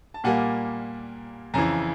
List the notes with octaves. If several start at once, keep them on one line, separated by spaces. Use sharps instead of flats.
A5
A#2 G3 A#3 F#5 G#5
F2 C#3 E3 G#5 A#5